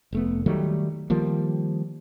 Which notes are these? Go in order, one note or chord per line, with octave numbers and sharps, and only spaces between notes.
F1 A3 B3
D#3 F#3 G3 A3
D#3 F3 G3 A#3